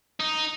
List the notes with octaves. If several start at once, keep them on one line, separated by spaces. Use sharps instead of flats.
D#4